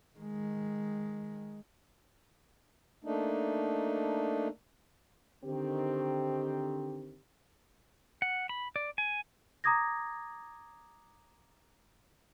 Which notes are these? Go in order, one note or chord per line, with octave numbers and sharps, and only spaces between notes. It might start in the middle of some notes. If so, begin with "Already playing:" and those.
D#3 G#3
A3 A#3 D4 D#4
D3 D#3 C4 G4
F#5
B5
D5
G#5
A#5 D6 D#6 G#6 A#6